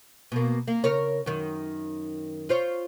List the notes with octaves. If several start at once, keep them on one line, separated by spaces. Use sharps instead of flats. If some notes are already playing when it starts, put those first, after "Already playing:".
B2 A#3
A#3
C#3 A#4 C#5
F#2 D#3
F4 C5 C#5